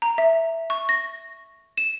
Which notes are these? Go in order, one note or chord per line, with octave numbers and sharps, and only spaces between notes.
A#5
E5
C#6
A#6
E7